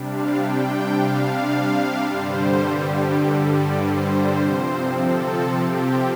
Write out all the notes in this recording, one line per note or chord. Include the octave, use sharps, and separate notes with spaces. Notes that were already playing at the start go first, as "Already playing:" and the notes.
Already playing: C3 G3 D4
F5
G5
G5
F5
G2 D3 G3 C5
G4
G4
A4
D5
C5
C3 F3 C4
A4
G4
G4